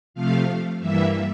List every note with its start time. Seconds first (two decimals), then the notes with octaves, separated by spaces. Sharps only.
0.14 C3 F3 A3 F5
0.80 G2 E3 G3 A#3 E5